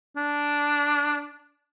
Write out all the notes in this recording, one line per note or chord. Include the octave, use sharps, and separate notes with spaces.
D4